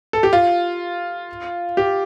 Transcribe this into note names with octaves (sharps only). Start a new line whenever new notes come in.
A4
G4
F4
G4